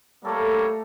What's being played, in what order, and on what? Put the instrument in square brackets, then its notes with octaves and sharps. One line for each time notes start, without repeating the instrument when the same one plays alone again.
[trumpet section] G3 A#3 C#5 [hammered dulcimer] A3 A4